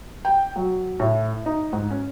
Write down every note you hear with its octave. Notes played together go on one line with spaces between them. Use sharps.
G5
F#3
A2
D#4
G#2
C#4